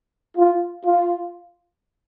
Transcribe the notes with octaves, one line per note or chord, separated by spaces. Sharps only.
F4
F4